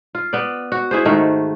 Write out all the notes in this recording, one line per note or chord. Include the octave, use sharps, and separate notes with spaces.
F4
B3 D5
F#4
E4 G#4 C5
G#2 D#3 A3